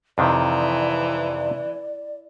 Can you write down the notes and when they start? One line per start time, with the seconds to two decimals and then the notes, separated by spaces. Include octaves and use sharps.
0.18 F2 C3 D#3 E3 D5